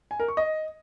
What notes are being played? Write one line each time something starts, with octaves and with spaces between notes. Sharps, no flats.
G#5
A#4
C#6
D#5